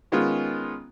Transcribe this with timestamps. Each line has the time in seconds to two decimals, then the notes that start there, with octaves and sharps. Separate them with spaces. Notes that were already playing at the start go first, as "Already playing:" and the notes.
0.12 D#3 G#3 B3 C#4 F4